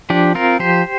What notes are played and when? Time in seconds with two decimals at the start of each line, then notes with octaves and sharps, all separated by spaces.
0.10 F3 D4 G4
0.35 C4 F4 A#4
0.59 F3 G4 C5